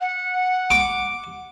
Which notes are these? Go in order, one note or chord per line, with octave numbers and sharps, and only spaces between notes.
F#5
D6